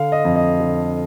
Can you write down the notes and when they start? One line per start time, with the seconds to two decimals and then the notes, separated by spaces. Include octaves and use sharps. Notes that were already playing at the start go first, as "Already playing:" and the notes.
Already playing: D3 F5
0.12 D#5
0.25 F2
0.36 D#5
0.60 D3